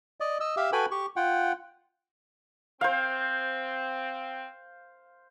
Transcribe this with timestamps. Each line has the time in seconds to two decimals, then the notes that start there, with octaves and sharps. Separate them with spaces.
0.20 D5 D#5
0.40 D#5 E6
0.57 G4 E5 F5 E6
0.72 F#4 A4 B4 G5 G#5 B5
0.91 G4 C#6
1.16 F4 F#5 G5
2.81 C4 C5 F5